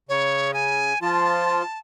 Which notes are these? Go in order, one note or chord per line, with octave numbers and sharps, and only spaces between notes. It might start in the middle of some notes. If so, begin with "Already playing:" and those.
C#3 C#5
G#5
F3 F4 A5